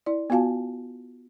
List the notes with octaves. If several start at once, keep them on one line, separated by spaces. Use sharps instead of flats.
E4 D5
B3 F4 F#4 F5 G#5 A5